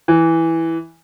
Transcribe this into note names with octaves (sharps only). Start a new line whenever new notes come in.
E3